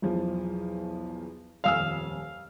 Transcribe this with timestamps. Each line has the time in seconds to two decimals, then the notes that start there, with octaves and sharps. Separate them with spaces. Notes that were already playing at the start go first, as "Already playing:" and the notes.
0.02 B1 E2 F3
1.64 D#1 F2 F5 G#5 E6 F6